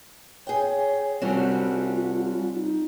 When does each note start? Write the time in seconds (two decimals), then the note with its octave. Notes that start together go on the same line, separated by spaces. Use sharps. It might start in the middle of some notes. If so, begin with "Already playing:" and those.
0.47 G#4 C#5 G5
1.22 D3 G3 C4 C#4 F4 F#4
2.55 D#4